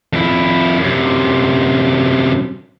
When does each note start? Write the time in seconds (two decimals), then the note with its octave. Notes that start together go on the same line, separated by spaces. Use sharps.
0.13 F2 E4
0.79 F#2 C3